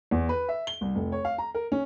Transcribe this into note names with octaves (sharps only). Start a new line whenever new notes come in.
E2
B4
E5
G7
C2
F1
C#5
F5
A#5
A#4
C#4